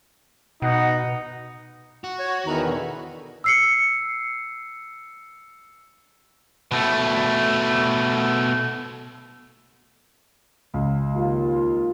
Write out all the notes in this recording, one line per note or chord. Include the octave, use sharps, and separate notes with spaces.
B2 D#4 F#5
F#4
C#5
E2 D#3 B4 A#5
B2 D3
E6 C7 C#7
B2 A3
C#2
D#2 F4